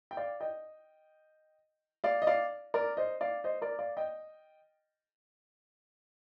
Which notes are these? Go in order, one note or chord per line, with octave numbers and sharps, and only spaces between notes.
G5
D5 F5
D#5 G5
D5 F5
D#5
D5 F5
A#4 D5
C5 D#5
D5 F5
C5 D#5
A#4 D5
D5 F5
D#5 G5